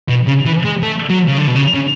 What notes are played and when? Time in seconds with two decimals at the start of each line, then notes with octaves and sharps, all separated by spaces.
0.09 B2
0.27 C#3
0.45 E3
0.65 G#3
0.83 A3
1.10 F#3
1.28 C#3
1.39 D3
1.48 B2
1.56 C#3
1.74 C#3